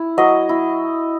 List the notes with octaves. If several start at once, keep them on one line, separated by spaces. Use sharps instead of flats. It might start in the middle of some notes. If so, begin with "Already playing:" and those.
Already playing: E4
F#3 D#5
E4